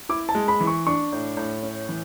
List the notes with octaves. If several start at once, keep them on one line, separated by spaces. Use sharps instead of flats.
E4 D6
A5
G#3
B5
E3
C#6
D4 C#6
A2
A2
C#4
E3